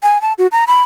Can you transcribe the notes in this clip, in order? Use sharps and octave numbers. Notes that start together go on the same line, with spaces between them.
G#5
A5
F#4
A#5
B5